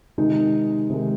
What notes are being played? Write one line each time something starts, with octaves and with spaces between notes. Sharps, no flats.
C3 D#3 G#3 D#4
C3 D#3 G#3